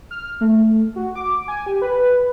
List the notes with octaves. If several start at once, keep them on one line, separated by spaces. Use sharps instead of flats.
F6
A3
A3
F#4
D6
G#5
G4
B4